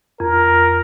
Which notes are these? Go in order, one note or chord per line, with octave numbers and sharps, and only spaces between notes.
F2 A#4